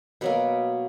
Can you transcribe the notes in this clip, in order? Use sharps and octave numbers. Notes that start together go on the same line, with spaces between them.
B2 F#3 A#3 B4